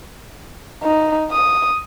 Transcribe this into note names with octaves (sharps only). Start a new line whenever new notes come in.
D#4
D#6